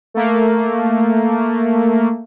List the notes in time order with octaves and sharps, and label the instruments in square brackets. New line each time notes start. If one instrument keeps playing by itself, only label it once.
[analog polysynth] A3 A#3